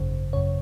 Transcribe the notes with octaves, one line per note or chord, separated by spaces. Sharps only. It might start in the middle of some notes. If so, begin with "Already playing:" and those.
Already playing: G#1 F#2 C#3 C5
F#2 C#3 C#5